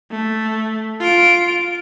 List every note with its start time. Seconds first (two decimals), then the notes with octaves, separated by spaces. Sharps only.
0.11 A3
1.00 F4 D7